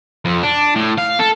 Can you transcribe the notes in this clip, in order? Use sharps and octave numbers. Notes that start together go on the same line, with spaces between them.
F2
D4
A2
F5
A4